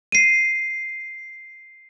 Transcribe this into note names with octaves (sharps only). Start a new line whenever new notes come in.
C7 D#7